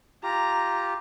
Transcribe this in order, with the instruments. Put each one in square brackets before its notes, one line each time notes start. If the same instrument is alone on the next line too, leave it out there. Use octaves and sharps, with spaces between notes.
[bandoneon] F4 G4 [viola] A#5